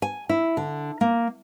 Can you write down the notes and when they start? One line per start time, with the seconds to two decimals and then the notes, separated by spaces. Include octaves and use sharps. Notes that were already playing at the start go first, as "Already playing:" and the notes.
0.02 G#5
0.29 E4
0.57 D3
1.01 A#3